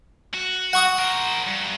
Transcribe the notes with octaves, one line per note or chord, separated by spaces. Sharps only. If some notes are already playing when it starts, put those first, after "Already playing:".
F#4
F#5 C#6 D#6
A#4 C5
G2